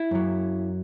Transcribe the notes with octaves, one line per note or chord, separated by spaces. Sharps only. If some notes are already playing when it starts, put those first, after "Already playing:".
Already playing: E4
F#2 F#3